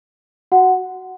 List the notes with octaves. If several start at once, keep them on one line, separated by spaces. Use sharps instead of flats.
F#4 F#5